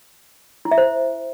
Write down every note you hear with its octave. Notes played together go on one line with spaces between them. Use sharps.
E4
E5
C5